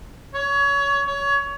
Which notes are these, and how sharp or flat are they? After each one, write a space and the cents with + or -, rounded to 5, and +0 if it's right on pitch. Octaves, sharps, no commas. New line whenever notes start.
C#5 +25
C#5 +25